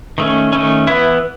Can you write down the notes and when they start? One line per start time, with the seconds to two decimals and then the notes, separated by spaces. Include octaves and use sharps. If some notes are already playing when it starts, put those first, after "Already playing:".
0.18 D#3 A3 C#4
0.53 D#3 A3 C#4
0.87 E3 B3 E4